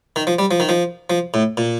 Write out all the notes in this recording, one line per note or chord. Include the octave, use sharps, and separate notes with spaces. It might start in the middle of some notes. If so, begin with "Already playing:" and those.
D#3
F3
G3
F3
D#3
F3
F3
A2
A#2